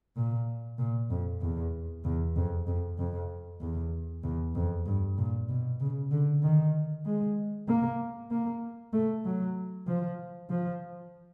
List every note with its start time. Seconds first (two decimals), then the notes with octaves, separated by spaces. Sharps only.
0.17 A#2
0.79 A#2
1.10 F2
1.41 E2
2.05 E2
2.36 F2
2.67 F2
2.98 F2
3.61 E2
4.24 E2
4.55 F2
4.86 G2
5.18 A#2
5.49 B2
5.80 C#3
6.11 D3
6.43 D#3
7.05 G#3
7.68 A#3
8.31 A#3
8.93 A3
9.25 F#3
9.87 F3
10.50 F3